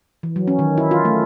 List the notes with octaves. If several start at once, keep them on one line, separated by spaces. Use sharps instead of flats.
E3
F#3
C#4
D#3
E4
F4
A3